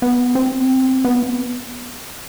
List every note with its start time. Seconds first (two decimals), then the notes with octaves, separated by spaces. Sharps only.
0.02 B3
0.35 C4
1.05 B3